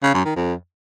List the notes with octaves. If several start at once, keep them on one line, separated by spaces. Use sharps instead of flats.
C#3
F#2
D#3
F2